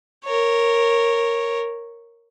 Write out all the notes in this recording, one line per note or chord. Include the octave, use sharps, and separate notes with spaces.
A#4 C#5